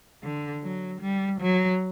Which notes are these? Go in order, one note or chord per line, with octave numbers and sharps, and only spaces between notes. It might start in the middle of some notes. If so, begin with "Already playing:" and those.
D3
F#3
G3
F#3